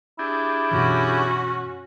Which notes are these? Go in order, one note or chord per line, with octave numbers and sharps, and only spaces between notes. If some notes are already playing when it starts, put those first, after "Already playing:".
D4 E4 G4 G#4
F#2 B2 E3 C#4 F#4